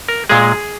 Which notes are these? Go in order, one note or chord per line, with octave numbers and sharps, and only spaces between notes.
A#4
A#2 G#3 G#4